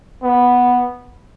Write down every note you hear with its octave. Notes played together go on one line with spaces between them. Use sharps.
B3